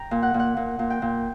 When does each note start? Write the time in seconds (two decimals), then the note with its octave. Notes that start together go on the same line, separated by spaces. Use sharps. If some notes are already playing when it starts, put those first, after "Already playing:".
Already playing: G5 A#5
0.11 A#2
0.23 F#5
0.34 A#2
0.40 F#5
0.57 A#2
0.79 A#2
0.90 G5
1.02 A#2